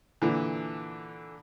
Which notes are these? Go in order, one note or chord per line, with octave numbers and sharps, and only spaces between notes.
A#2 D3 E3